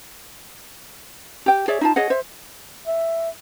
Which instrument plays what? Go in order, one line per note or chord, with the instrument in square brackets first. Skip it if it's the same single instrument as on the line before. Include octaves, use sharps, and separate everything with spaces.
[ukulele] G4 G5
G#4 C#5 D5 E5
D#4 F4 A5
G#4 C#5 D#5 F#5
C5 E5
[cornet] E5